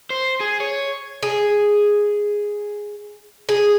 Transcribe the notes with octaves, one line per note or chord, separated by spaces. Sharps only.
C5
G#4
C#5
G#4
G#4